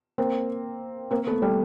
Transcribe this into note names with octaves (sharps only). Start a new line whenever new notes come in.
A#3 C4
A#3 C4
A3 B3
G3 A3